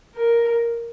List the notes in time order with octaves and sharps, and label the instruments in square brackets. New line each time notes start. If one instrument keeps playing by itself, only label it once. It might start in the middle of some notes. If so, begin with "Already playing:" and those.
[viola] A#4